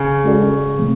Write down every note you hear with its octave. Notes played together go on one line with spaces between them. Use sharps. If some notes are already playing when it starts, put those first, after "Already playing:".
Already playing: C#3
G#3 C#4 F#4 A4 D5
C3 F3 A3 C4